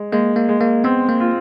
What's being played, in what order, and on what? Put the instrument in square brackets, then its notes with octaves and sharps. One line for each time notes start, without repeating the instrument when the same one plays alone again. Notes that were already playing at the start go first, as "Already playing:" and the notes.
Already playing: [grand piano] G#3
[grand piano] G#3 [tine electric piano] A#3
[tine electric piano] A#3
[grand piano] G#3
[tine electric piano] A#3
[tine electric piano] B3 [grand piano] C4
[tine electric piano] A#3
[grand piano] F4